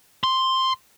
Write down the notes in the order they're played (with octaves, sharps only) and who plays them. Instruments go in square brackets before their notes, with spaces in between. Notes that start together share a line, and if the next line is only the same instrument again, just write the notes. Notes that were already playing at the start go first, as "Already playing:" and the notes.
[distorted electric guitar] C6